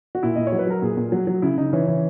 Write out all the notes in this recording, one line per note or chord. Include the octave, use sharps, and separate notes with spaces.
F#4
A#2 E4
A#2 D#5
C#5
F#3
B4
F#3 A#4
A#2 G#4
A#2
F#3
F#3
C#3 E4
C#3 D#4
E3 C#4
E3